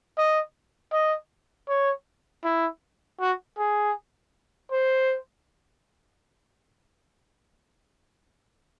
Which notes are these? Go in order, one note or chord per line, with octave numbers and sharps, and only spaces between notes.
D#5
D#5
C#5
E4
F#4
G#4
C5